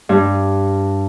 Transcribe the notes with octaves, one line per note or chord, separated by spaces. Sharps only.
G2